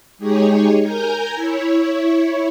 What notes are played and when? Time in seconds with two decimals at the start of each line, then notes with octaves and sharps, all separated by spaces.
0.18 G#3 D#4 G4 G#4 C#5
0.83 A#4 G#5 A#5 G6
1.35 E4 C#5